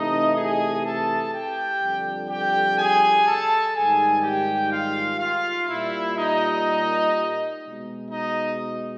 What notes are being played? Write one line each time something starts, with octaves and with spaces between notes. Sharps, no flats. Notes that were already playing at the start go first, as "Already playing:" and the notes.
Already playing: C3 E3 A3 D#4 D#5
G#4 G#5
A4 A5
G4 G5
F2 D3 G3
G4 G5
G#4 G#5
A4 A5
G#2 D#3 G3 G#4 G#5
G4 G5
F4 F5
F4 F5
A#2 G3 E4 E5
D#4 D#5
B2 G#3
D#4 D#5